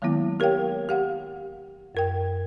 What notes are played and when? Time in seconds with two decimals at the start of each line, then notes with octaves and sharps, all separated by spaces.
0.02 D#3 F#3 G#3 A#3 B3 E4
0.40 G4 A#4 C#5 F5 G5
0.89 G4 F5 F#5
1.95 F#2 A#4 G5